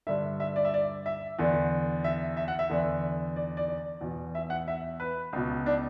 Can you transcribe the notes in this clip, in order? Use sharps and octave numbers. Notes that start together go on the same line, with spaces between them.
G2 D3 E5
E5
D5
E5
D5
E5
E2 D3
E5
E5
F#5
E5
E2 D3
D5
D5
D5
E2 B2
E5
F#5
E5
B4
C#2 B2
D4